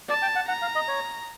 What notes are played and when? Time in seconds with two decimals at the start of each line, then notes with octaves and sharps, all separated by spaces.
0.09 D5 A5
0.22 G5
0.36 F#5
0.48 F#5 A#5
0.62 F5
0.75 D#5
0.88 C#5